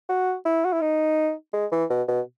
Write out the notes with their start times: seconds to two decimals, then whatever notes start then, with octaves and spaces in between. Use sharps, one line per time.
0.09 F#4
0.45 E4
0.65 F#4
0.73 E4
0.81 D#4
1.53 G#3
1.72 E3
1.90 B2
2.08 B2